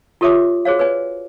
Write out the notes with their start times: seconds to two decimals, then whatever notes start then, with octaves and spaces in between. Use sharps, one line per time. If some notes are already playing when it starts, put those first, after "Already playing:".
0.21 F4 G4 A4 C#5 E5 D6
0.65 F#4 G#4 C5 C#5 F5
0.79 B4 C#5 D5 G#5